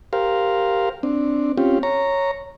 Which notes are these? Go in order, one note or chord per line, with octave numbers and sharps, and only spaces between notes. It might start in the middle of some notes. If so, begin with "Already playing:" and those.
G4 A#4 C5 F5
C4 D4
C4 C#4 F4 G4
C#5 A#5